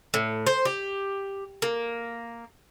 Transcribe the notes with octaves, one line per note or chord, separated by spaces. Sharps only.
A2
C5
G4
A#3